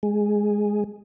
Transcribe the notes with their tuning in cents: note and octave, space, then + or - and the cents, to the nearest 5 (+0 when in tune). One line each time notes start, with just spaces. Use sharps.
G#3 +0